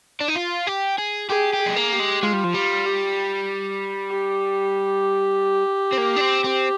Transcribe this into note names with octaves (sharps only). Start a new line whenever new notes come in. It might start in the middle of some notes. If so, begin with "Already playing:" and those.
D4
D#4
F4
G4
G#4
G4 G#4
G4
G#4
G#3
A#3
G4
G#3
G#3 F4
G3
F3
G3 F4
G4
G4
C4
A#3
D4
C4
C4